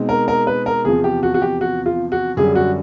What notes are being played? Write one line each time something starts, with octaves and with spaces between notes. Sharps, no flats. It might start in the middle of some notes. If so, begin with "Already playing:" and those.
Already playing: B2 G#3 C4 D#4
A#4
A#4
B4
A#4
E2 C3 F3 G#4
G4
F#4
F#4
G4
F#4
F4
F#4
F#2 D3 G3 G#4
F#4